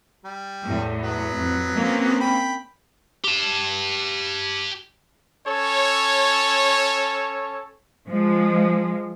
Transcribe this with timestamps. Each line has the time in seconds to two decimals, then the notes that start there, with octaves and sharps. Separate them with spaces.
0.25 G3
0.63 E2 A2
1.03 F#3 B3
1.35 F2
1.75 A#3 C4 C#4
2.20 G5 B5
3.24 G4 A5
5.47 C#4 A4 C#5
8.07 F3 G#3